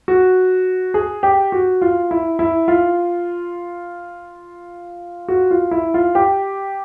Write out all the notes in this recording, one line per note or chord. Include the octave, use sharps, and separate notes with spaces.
F#4
G#4
G4
F#4
F4
E4
E4
F4
F#4
F4
E4
F4
G4